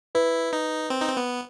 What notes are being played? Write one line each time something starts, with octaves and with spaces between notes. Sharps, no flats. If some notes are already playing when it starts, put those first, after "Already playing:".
E4 B4
D#4
C4
D#4
C4
B3